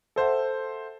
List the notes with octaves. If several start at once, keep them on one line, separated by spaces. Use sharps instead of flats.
A4 C5 E5 F#5